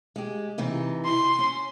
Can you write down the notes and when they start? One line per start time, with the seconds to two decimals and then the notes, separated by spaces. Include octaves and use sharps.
0.16 G#3 G4
0.58 C3 E3 D#4
1.05 C6
1.39 C#4